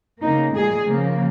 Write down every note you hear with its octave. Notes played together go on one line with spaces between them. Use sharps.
C#3 A#3 D#4
A#2 G#3 G#4
C#3 F3 A#3